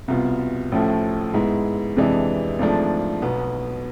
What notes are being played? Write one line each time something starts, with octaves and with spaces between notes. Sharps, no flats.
C2 B2 B3 F4
A1 A2 F3 A3
G#2 G#3 B3 E4
F2 C3 E3 G#3 D4
G#1 G#2 F3 A3 D4
B1 B2 B3